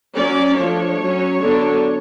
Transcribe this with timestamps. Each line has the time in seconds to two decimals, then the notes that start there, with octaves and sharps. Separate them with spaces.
0.14 F#3 C#4 D5
0.56 F3 A3 D4 C#5
1.00 F#3 C#4
1.41 D3 F#3 B3 D4